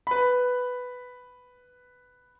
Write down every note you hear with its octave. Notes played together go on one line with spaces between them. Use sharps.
B4 B5